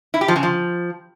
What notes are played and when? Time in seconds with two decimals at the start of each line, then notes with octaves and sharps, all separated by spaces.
0.14 E4
0.21 G4
0.28 F3
0.36 C#3
0.43 F3